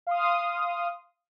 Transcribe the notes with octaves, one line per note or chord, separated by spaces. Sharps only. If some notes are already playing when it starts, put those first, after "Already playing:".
F5 C6 D#6